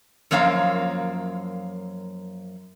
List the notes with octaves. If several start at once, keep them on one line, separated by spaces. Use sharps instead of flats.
F#2 F3 A#3 C#5 F5 A#5